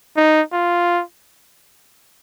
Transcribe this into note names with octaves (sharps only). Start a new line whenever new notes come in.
D#4
F4